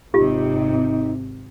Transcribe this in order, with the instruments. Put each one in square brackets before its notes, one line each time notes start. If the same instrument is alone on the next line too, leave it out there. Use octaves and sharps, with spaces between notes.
[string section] G#1 C3 [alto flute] D#4 [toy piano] F4 G4